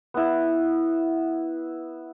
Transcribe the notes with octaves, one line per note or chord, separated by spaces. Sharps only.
B3 E4